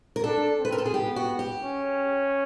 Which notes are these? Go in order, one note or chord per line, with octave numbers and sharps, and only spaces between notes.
A#4
D4 A4
C4
B4
A#4
A4
G#4
B3 G4
F#4
G4
C#4